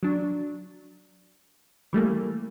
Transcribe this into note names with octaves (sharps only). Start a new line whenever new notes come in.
F#3 D4
E3 G3 A3 A#3